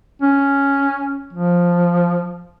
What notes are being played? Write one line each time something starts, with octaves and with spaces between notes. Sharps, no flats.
C#4
F3